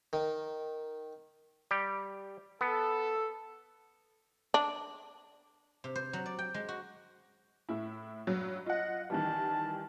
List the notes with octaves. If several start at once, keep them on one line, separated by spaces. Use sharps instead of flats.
D#3
G3 G4
B3 A4
D4
C3
C5
F#3
D5
G5
G#3
F#4
A2 E4
G2 F#3
F4 D#5 F#5
D#3 E3 G3 A5